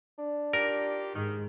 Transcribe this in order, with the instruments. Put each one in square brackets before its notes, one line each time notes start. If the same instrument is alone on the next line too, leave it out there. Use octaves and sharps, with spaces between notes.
[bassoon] D4
[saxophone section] D#4 F4 G4 [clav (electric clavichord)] A#4
[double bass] G#2 [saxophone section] D#3